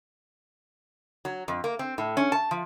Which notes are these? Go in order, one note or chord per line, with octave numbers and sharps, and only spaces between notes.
F#3
F2
A#3
C4
A2
C#4
A5
F3